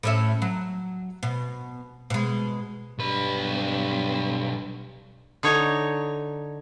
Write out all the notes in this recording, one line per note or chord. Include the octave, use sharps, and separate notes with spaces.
A2 C#4 E5
F#3
B2
B2 G#3
B1 G2 B4
D3 D#4 C#5 A#5